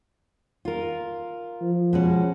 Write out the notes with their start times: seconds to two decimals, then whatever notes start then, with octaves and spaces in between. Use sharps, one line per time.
0.65 F4 A#4
1.61 F3
1.93 B2 G#3 C#4